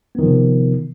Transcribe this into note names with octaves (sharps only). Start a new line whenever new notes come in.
C3 D#3 F3 B3